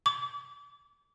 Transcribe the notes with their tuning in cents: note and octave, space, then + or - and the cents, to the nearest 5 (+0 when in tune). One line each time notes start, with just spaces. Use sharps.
D6 -30